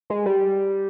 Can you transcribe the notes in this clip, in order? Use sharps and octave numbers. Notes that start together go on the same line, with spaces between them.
G#3
G3